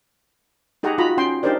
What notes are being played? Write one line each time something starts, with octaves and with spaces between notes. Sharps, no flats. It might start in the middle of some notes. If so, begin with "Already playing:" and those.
D#4 G4 G#4 F#5 G#5 A#5
D#4 F4 F#4 A#5 B5
C#4 G5 C6
D4 D#4 G4 A#4 C5 D5